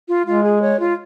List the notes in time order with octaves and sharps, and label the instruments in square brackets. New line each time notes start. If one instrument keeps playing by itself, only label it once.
[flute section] F4
[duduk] G#3 [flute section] F4
[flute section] G#4
C#5
F4